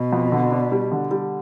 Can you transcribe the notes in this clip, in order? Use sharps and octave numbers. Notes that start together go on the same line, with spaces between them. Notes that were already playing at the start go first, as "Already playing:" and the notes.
Already playing: B2
F2
D3
D4
G3
D3
G3